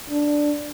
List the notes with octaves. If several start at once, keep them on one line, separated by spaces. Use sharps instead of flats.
D4